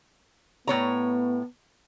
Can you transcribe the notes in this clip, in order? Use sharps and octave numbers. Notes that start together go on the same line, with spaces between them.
A2 B3 C#5 A#5